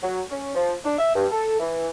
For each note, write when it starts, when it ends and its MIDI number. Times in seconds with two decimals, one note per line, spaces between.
0.03 0.21 54
0.30 0.52 61
0.55 0.74 53
0.85 0.95 62
0.99 1.14 76
1.15 1.26 43
1.31 1.57 69
1.60 1.88 52